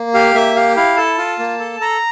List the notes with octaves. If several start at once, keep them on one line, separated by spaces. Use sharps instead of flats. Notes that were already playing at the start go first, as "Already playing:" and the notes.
Already playing: A#3
G4 F5
A#3 E5
G4 F5
E4 F5
A4 A5
F4
A#3
A4
A4 A#5